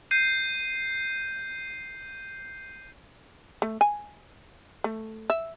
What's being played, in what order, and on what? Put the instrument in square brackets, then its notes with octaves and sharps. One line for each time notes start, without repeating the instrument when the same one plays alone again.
[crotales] G6 C7 D#7
[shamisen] A3
G#5
A3
E5